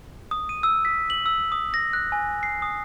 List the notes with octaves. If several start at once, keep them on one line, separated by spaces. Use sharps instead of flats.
D#6
D#7
E6
B6
F#7
E6
D#6
A#6
F#6
G#5
C7
D#6